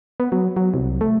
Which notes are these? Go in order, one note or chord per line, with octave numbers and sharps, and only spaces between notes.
B3
F#3
F#3
C2
A3